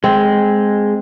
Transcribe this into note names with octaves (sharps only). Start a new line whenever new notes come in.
G#3 C4